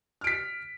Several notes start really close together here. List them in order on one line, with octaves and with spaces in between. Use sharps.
F6 D7 B6